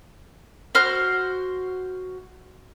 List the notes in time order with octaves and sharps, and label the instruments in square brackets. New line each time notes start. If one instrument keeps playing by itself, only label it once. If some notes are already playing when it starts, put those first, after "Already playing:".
[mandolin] F#4 C5 F6